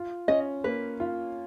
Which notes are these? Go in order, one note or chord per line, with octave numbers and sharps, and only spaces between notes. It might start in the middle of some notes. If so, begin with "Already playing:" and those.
Already playing: F4
C#4 D#5
A#3 B4
F4